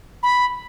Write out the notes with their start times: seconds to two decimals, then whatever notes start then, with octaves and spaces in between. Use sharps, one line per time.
0.23 B5